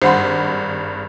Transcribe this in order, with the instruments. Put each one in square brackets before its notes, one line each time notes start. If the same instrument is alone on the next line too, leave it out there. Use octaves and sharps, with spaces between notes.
[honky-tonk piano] G#1 G2 B5 [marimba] C5 F#5 C6